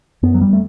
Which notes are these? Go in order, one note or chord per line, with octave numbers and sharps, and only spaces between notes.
F#2 B3
F#3
G3
A3